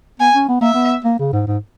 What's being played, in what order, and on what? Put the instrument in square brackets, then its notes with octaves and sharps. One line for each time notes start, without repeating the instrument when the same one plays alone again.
[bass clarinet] B3 [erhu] G#5
[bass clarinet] C#4
B3
[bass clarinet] A#3 [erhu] E5
[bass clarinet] B3
A#3
C#3
G#2
G#2